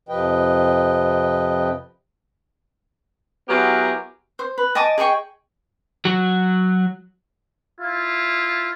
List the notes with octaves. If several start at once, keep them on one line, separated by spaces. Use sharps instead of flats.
F2 C3 F3 B4 D#5 G5
F#3 B3 E4 G4 G#4 A#4
C5
B4
D#5 G#5 A5 D6
G#4 D#5 G5 C#6
F#3 F#4
E4 F4